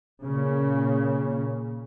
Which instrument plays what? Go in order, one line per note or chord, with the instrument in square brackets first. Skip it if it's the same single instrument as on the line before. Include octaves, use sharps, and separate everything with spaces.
[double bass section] A#2 C#3